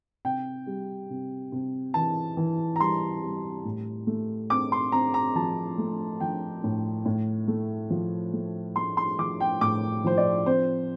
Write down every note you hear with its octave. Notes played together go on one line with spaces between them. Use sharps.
C3 G5
G3
C3
C3
E3 A5
E3
A#5
G3 C6
G3
A2
A3
C4 D6
C6
C4 A#5
A#5
F3 A5
A3
F3 G5
A2
A2
A3
F3
A3
A3 C6
C6
F3 D6
G5
A2 D6
F3 C5
D5
C4 C5